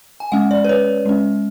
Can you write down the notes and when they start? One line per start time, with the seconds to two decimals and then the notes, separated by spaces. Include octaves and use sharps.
0.20 G#5
0.32 G#3 C#4 F#5
0.51 D5
0.64 B4
0.69 C#5
1.06 G#3 C#4